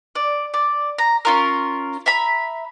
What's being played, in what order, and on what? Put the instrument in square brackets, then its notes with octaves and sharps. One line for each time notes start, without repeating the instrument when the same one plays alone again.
[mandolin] D5
D5
A#5
C#4 F4 A#4
E5 A#5 B5